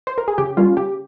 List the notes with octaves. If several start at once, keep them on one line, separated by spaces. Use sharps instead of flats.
C5
A#4
G#4
C#3 G4
G3 A#3 C#4 F4
C#3 G4